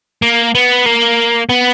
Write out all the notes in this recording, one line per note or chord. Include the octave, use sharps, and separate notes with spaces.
A#3
B3
A#3
B3